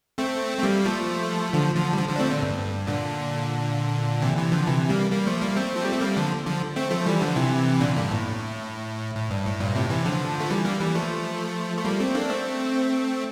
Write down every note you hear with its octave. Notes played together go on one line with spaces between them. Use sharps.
A3 C4
A3
G3 A#3
F3 A3
D3 F3
D3 F3
G3
D3 F3
D3 F3
D4
A3 C4
A#2 D3
G2
A#2 D3
C3 E3
C3 E3
D3 F3
C3 E3
G3 A#3
G3 A#3
F3 A3
G3 A#3
A3 C4
F3
G3
A3
G3 A#3
D3 F3
D3 F3
A3 C4
F3 A3
E3 G3
D3 F3
C3 E3
A#2 D3
G2 A#2
A2
A2
G2
A2
G2 A#2
A2 C3
C3 E3
D3 F3
A3
E3 G3
G3 A#3
E3 G3
F3 A3
A3
G3 A#3
A3 C4
A#3 D4
A3 C4